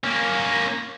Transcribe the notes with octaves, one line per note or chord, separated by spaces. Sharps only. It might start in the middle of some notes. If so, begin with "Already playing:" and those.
A#3 C#4